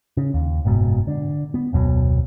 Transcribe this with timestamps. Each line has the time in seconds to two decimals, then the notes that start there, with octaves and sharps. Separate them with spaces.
0.17 C#3
0.34 D#2
0.65 F#1 G#2 B2
1.07 D3
1.54 B3
1.73 F1 D2 B2 F#3